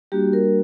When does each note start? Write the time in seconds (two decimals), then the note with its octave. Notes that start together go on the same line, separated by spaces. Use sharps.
0.12 G3 A#3 D4 F#4 G4
0.33 A#4